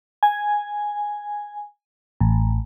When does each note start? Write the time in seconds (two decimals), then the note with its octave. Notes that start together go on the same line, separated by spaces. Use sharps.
0.23 G#5
2.20 A1